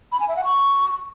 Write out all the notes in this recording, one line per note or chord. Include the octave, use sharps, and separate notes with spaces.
B5
G#5
E5
F#5
C#6